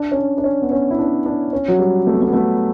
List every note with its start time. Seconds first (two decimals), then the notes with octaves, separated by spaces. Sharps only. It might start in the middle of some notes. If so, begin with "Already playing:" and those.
Already playing: D4
0.12 C#4
0.18 D4
0.38 D4
0.44 C#4
0.62 B3
0.71 C#4
0.90 E4
0.99 D4
1.26 D4
1.53 C#4
1.68 F#3
1.79 G3
2.07 A3
2.14 B3
2.22 A3
2.28 B3
2.33 A3